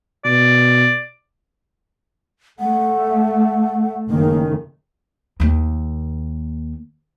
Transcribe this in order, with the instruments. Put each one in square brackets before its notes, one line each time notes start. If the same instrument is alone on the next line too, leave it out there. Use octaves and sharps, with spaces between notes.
[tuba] B2 [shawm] D5
[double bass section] A3 [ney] F#5
[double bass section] F#1 D#3 [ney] A#3
[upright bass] D#2 A#3